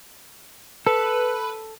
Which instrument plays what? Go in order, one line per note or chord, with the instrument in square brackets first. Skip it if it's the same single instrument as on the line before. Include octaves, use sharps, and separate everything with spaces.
[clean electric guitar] A4 [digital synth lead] B4